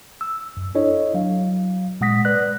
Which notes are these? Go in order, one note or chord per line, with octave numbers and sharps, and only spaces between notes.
E6
F#2
D4 E4 A4 C#5 D#5
F#3 F5
A#2 G#3 F#5 D#6 A#6 B6
B4 D5 F#6